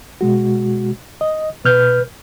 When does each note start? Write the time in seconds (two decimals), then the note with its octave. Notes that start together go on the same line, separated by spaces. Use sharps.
0.21 B2 G#3 F#4
1.21 D#5
1.65 B2 B4 F6 G6